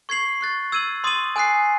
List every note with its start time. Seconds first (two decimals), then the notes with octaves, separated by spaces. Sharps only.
0.09 C#6 G#6 C7 F#7
0.41 C#6 F#6 A6
0.72 E6 G#6 D#7 F#7
1.04 C6 D#6 A6 D#7 F#7
1.36 G#5 D#6 F#6 C7